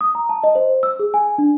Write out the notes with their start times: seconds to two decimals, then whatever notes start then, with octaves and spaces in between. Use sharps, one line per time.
0.01 D#6
0.15 A#5
0.29 A5
0.43 D#5
0.55 C5
0.83 E6
0.99 G#4
1.14 G#5
1.38 D4